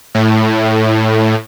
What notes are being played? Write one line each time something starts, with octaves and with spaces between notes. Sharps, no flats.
A2